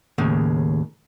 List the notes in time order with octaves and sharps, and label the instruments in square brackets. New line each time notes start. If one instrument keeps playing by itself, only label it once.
[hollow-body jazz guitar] D#2 A2 C#3